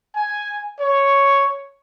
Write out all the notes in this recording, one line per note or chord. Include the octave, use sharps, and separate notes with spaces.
G#5
C#5